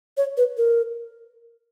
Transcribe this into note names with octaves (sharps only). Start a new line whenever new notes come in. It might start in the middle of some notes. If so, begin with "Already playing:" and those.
C#5
B4
A#4